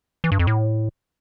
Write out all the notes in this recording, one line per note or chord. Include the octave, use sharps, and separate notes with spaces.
E3
G2
F2
A2